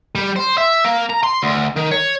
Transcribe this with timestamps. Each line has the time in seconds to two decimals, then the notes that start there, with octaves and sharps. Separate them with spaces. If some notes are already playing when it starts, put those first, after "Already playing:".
0.15 G3
0.36 C5
0.58 E5
0.84 A#3
1.10 A#5
1.23 C6
1.43 D2
1.76 D#3
1.91 C#5